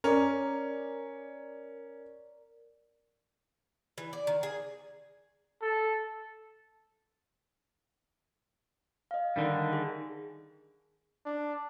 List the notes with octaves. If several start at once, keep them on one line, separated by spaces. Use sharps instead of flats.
C#4 A#4 D5
E3
D5
D#3
G#4
A4
D#5 F5
D3 D#3 G3
G#4
D4